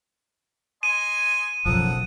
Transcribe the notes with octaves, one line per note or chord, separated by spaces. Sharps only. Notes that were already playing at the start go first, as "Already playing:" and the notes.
D#5 G#5 C6 D#7
F#1 B1 F#2 F3 A4 F#5 D#6